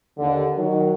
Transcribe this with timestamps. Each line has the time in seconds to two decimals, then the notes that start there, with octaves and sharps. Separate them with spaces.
0.18 D#2 D3
0.57 D#3 F#3